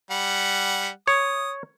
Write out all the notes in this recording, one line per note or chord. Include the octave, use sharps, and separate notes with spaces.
G3 F#5
C#5 D#6